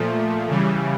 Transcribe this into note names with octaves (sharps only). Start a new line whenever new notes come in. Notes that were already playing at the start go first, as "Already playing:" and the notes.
Already playing: A#2 F3 A3
C#3 E3 G3